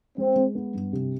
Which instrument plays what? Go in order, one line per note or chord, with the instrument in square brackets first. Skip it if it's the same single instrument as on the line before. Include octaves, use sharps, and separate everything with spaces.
[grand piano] G#3 [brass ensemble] C4
[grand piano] G#3
B3
G2
C3